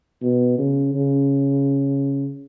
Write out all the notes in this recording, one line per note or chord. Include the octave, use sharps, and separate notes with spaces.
B2
C#3
C#3